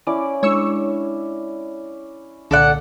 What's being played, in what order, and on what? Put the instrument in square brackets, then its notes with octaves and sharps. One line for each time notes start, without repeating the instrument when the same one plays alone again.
[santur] C#4 E4 D5 [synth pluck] D6
[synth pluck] G#3 D4 [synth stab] C#5 C#6 E6
[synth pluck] C2 A#2 [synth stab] D3 [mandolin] A4 D5 F#5